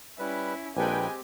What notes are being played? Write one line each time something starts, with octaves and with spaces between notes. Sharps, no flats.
G3 C#4 E4 B4
A#1 G#3 C4 G4 A4 B4 G5 G#5